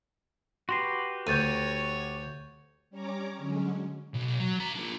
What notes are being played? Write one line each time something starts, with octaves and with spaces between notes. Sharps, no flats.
F#4 G4 B4 C6 A#6 C7
D2 C#5 G6 A6 D#7
G3 C#4 C#5 A#5 D6
D3 F#3 G#3 C#4
B1
F#3
B2 A#5
D4 F4